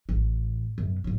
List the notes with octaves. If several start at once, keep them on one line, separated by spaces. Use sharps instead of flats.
A1
F#2 B2
A2 F#3